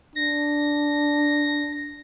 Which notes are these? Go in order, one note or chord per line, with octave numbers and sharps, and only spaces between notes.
D4 A#6